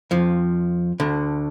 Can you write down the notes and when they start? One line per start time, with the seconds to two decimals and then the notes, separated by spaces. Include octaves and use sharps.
0.11 F2 F3
1.00 D2 D3